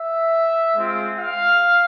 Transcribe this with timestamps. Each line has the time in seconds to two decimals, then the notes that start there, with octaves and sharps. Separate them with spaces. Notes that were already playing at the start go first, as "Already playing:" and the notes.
Already playing: E5
0.76 G#3 C4 F4
1.20 F5